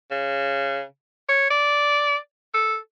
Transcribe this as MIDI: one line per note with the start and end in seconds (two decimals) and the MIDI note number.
0.11 0.83 49
1.29 1.47 73
1.50 2.18 74
2.54 2.76 69